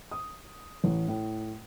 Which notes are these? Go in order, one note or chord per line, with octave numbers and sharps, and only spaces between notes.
D#6
A1
A2